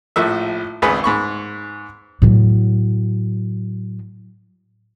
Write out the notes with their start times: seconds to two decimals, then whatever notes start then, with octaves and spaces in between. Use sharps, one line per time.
0.16 A#1 A2 F3 E5
0.82 G#1 C#2 G#4 B4
1.04 G#2 B5 C#6
2.22 A2 F#3